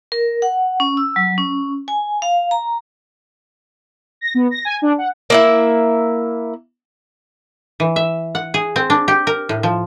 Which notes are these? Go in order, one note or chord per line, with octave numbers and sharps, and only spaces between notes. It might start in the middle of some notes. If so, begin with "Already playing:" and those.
A#4
F#5
C#4
E6
F#3
C#4
G#5
F5
A#5
A#6
B3
A#6
G#5
D4
F#5
A#3 E4 E5
E3
E5
F#5
G#4
C4
D4
G4
A#4
A2
F3